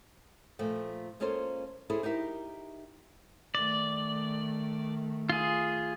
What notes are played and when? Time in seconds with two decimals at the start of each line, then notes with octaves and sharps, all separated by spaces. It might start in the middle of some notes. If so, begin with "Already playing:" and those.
0.59 A#2 F3 A3
1.20 G#3 A#3 C#4 F4 A4 C5
1.90 C#4 E4 G#4 A4 C5
2.03 D#4 G4 A#4 E5
3.55 D#3 A3 D5
5.30 F4 G#4